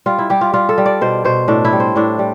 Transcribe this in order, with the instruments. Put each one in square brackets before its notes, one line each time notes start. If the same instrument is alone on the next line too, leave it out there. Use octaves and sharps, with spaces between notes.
[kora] G3 F4
E4
G3 G4
F4
G3 F4
A4
G3
D5
B2 C5
B2 C5
A2 D4
E4
G3
C5
A2 D4
G3